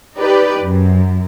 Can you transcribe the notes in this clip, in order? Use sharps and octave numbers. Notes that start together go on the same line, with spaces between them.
D#4 G4 B4 D5
F#2